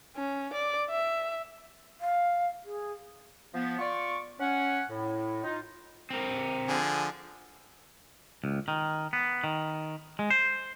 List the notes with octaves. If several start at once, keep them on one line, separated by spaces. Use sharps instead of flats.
C#4
D5
E5
F5
G#4
F3 B3
F4 D5 C#6
C#4 F#5
A2
D#4 F4
C4 A#4
D3 F3 G#4
C#2
D#3
B3
D#3
G#3
C5